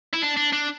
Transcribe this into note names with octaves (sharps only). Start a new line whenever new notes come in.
E4
D4
D4
D4